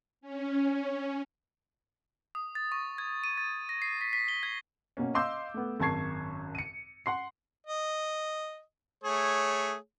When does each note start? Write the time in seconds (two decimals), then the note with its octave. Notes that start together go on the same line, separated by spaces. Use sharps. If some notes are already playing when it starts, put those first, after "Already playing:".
0.21 C#4
2.35 D#6
2.55 A6
2.72 C#6
2.98 G#6
3.24 D#7
3.38 A6
3.69 A#6
3.82 C7
4.01 B6
4.13 B6
4.28 G7
4.43 G#6
4.97 B2 A#3 C#4
5.14 D#5 F5 C6 D6 E6 G6
5.54 A3 B3
5.80 G#1 F#2 A5 C#6 G#6 C7
6.55 C#7 D#7
7.06 F#5 C6 C7
7.66 D#5
9.04 A3 G#4 C#5